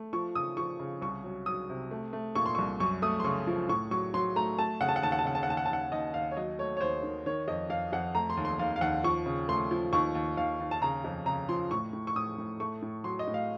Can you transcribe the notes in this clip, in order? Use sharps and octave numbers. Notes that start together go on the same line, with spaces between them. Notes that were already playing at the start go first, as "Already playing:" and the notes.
Already playing: A3
F3 C#6
C#3 D#6
F3 C#6
C#3
C2 C#6
F#3
F#3 D#6
C3
A3
A3
A#2 C#6
C6
C2 C#6
F#2 C#6
A3 D#6
C6
C#3 C#6
F3
A2 C#6
F#3 C#6
F#3 C6
A3 A#5
A3 A5
C#3 F#5
A5
F#5
D#2 A5
F#5
A5
C#3 F#5
A5
F#5
D#2 A5
F#5
A5
D#2 F#5
D#2 D#5
D#2 F5
C#5
F#3 D#5
A3 C#5
C#5
D#2 C5
D#3
D#3 C#5
F2 D#5
F2 F5
F2 F#5
A3 A#5
C6
D#2
C6
D#2 F5
F5
D#2 F#5
F3 C#6
C#3
A3 C6
F3
D#2 C#6
D#2
D#2 F5
D#2
A5
C#3 A#5
F2
C#3 A#5
F3 C6
A2 C#6
A2
C#6
A2 D#6
A2
A3 C#6
A2
F#3 C6
D#5
A2
F5